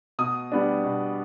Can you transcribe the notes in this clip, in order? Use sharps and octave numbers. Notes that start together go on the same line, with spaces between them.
B2 D#6
G3 B3 D4
B2